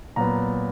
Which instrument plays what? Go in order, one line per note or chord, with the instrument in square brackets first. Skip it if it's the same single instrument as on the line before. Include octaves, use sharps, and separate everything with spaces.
[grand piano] A#2 F#3 B3 A#5